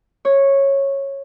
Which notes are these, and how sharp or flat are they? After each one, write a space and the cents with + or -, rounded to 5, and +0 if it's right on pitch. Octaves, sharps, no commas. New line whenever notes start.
C#5 -10